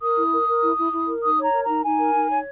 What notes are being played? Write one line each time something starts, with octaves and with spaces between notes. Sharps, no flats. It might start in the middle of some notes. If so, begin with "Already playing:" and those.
A#4 D#6
E4
A#4
A#4
E4
E4
E4
A#4
D#4 D#6
C#5
A#5
A#4
D#4 A#5
D#4 G#5
A#4
D#4
C#5